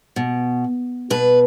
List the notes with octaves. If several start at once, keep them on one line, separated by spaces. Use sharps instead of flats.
B2
B2 B4